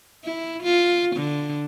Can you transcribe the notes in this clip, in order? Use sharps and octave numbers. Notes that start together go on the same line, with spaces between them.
E4
F4
D3